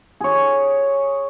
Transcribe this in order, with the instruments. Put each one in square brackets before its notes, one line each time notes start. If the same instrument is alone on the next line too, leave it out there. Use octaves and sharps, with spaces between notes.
[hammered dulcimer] G#4 C#5